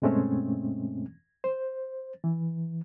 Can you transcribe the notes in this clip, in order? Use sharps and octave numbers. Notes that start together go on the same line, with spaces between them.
G2 B2 G#3 A3 C4 C#4
C5
E3